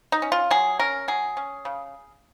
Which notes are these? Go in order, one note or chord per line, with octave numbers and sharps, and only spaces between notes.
D#4
C#4
F4
F#3 G#4
C#4 A#4
F#3 G#4
C#4
C#3